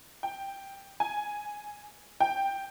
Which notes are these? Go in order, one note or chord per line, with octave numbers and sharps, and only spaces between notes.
G5
G#5
G5